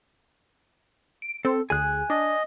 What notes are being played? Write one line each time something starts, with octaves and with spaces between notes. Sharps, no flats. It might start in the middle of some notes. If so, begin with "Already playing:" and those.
D7
C4 A4
D2 G#4 G#5 F#6
D4 D#5